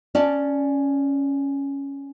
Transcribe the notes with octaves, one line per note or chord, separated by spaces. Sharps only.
C#4 D5 A5